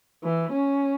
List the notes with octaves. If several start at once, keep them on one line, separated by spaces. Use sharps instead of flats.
E3
C#4